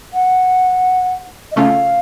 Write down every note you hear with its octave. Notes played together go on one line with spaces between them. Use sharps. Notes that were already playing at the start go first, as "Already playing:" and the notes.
F#5
D#5
C#3 A3 C#4 F4 F5